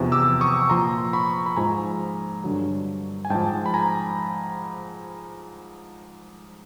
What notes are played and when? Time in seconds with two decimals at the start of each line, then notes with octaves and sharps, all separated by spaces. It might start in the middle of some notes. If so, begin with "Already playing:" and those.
Already playing: E2 C3 F3
0.12 D6 E6
0.41 C#6 D#6
0.70 A#2 F3 A#5 C6
1.13 B5 C#6
1.46 B5
1.56 G#2 F3 G#5 A#5
2.44 G2 D3 F#3
3.25 G#5
3.30 G#2 F3 G5 A5
3.66 B5
3.74 G#5 A#5